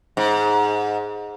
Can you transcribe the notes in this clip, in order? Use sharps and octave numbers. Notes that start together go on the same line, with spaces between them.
G#2